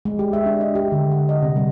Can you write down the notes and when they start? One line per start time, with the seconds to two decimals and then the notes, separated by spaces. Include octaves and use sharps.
0.05 G#3
0.19 G4
0.33 E5
0.46 D4
0.61 D#5
0.75 G4
0.92 D3
1.11 F#5
1.29 D#5
1.42 C3
1.56 G3